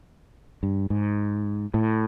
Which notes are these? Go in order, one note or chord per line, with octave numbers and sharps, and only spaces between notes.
G2
G#2
A2